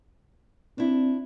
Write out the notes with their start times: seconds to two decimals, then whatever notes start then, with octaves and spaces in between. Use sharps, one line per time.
0.78 C4 D4 E4